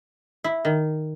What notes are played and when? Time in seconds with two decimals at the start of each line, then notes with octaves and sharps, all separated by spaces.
0.44 E4
0.65 D#3